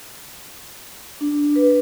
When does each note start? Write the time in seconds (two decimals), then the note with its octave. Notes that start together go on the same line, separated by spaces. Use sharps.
1.21 D4
1.56 B4